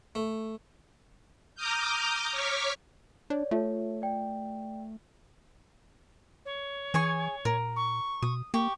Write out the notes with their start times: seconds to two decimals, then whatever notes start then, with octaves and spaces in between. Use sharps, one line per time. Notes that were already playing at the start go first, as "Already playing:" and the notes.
0.15 A3
1.55 A#5 D6 D#6 F6 G6
2.32 C#5 C#6 D6 F6 B6
3.30 D4 C#5 D5
3.51 A3 F4 A4 C#5 E5 A5
4.02 D5 G5
6.45 C#5
6.94 E3 G#4 G#5 C#6
7.45 A#2 A#4
7.76 C#6
8.22 B2 D#6
8.54 A#3 G4 C#6